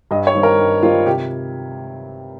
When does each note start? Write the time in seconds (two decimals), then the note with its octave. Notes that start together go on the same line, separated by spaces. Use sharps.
0.11 G2 D#5
0.27 C#5
0.35 D#3 G3 C4 D#4
0.43 A#4
0.59 G2
0.83 D#3 G3 C4 D#4 F4
1.06 C3 G4